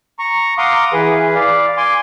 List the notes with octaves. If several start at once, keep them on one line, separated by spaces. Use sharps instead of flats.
A#5 C#6
F5 F#5 A#5 C6 D6 D#6
E3 G#4 B4
D5 F5
G#5 C6 D6